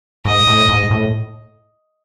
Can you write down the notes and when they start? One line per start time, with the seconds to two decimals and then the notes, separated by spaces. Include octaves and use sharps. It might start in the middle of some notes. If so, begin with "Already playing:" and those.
0.25 G#2 D#5
0.47 A2
0.69 G#2
0.91 A2